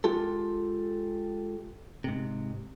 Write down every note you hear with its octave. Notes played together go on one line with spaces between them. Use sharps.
G#3 F4 G4 A4
G#2 C3